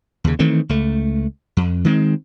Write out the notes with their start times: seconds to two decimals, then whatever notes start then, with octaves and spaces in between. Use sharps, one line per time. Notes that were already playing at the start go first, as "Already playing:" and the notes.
0.24 D#2 C#3
0.39 D#3 E3 A3 C4
0.69 C#2 A3
1.57 F2
1.85 D#3 G#3 A3 C4